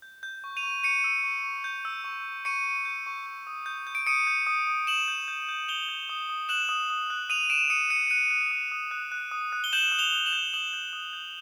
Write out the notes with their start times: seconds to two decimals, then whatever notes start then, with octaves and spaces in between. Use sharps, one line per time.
0.02 G6
0.23 G6
0.44 C#6
0.57 D#7 F7
0.63 C#6
0.83 C#6 C#7 D#7
1.04 E6
1.24 C#6
1.44 C#6
1.64 G6
1.85 E6
2.04 C#6
2.25 C#6
2.45 C#6 C#7 D#7
2.65 C#6
2.85 G6
3.06 C#6
3.26 G6
3.47 D#6
3.66 G6
3.87 G6
3.95 D7
4.06 D#6 C#7 D#7
4.27 G6
4.47 D#6
4.67 D#6
4.87 D#6 E7 F#7
5.08 G6
5.28 G6
5.49 G6
5.68 G6 F7 G7
5.89 G6
6.09 D#6
6.30 D#6
6.49 F#6 E7 F#7
6.69 D#6
6.90 D#6
7.10 F#6
7.30 D#6 D#7 F7
7.50 D#6 D7 E7
7.70 D#6 C#7 D#7
7.90 F#6 C#7 D#7
8.10 F#6 C#7 D#7
8.30 F#6
8.51 D#6
8.72 D#6
8.91 F#6
9.12 F#6
9.31 D#6
9.53 F#6
9.64 G7
9.73 G6 E7 F#7
9.92 D#6
9.99 F7 G7
10.13 D#6
10.26 E7 F#7
10.33 G6
10.53 D#6 E7 F#7
10.73 G6
10.93 D#6
11.13 G6